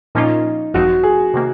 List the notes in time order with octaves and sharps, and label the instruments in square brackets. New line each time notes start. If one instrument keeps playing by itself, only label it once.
[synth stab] A#2 F3 A#3 C#4 F4 [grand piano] D#4
[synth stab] G#1 F#2 F3 C4 D#4 [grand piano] F#4
[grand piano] G#4
[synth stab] C3 D#3 A#3